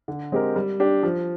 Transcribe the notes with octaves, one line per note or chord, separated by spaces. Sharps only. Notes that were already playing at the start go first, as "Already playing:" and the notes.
D3
G#3 C4 G4 A#4
G3
D4 G4
F3